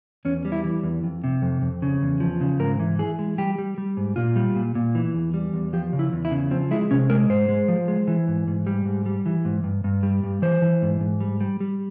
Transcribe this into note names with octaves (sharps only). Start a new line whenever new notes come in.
E2 C#4
G3
E4
E3
E2
F2
C3
F2
F2
C#3
E2
F3
C#3
G#2 A#4
E3
E3 G#4
G#3
G3 G4
G3
G3
G#2
A#2 F4
G3
A#2
A#2
E3
E2
G3
E2
F3 G4
C#3
E4
E2
E4
C#3
F3 C4
G#3 E4
C3 C#4
G#3 A#4
G#2 C5
G#3
F3
G#3
E3
G#2
G#2
G3
G#2
G3
E3
G#2
G2
G2
G3
G2
E3 C5
E3
G#2
G#2
G3
G3
G3